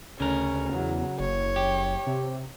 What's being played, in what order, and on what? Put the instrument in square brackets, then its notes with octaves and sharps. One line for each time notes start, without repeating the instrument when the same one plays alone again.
[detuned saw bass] D2 [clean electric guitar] C#3 A#4 [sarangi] C#4
[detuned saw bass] E2 [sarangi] F#3
[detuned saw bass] F#1 [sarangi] C#5
[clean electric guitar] G4
[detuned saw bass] C3